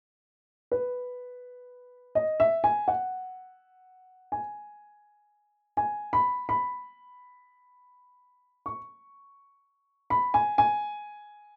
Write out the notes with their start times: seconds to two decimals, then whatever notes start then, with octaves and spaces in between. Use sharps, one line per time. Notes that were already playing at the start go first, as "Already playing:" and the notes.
0.72 B4
2.15 D#5
2.40 E5
2.64 G#5
2.88 F#5
4.32 G#5
5.77 G#5
6.13 B5
6.49 B5
8.66 C#6
10.10 B5
10.34 G#5
10.58 G#5